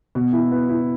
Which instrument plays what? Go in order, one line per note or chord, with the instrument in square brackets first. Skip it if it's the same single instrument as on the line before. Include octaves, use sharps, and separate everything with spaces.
[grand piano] B2
E4
B3
E4